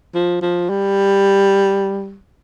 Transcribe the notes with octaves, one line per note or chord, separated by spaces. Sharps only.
F3
F3
G3